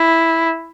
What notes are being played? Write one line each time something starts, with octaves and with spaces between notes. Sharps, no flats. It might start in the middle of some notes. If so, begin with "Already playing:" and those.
Already playing: E4